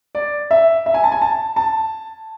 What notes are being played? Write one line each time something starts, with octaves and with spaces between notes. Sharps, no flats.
D5
E5
E5
G#5
A5
G#5
A5
A5